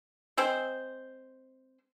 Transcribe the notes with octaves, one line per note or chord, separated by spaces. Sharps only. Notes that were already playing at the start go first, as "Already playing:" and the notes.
G#3 C4 C5